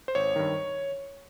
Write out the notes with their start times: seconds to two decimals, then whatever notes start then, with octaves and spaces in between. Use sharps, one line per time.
0.08 C5
0.15 G#1 C#5
0.36 G2 D#3